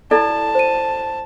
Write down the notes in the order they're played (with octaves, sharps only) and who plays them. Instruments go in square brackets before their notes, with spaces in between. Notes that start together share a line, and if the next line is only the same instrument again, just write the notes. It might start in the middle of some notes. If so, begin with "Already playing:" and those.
[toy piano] E4 A4 D5 [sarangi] A5
[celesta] C5 D#7